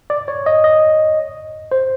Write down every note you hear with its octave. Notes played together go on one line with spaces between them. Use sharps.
D5
C#5
D#5
D#5
C5